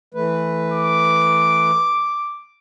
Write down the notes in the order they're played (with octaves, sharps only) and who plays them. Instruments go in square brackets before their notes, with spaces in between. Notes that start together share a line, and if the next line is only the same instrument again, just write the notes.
[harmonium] E3 A3 B4
[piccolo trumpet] D6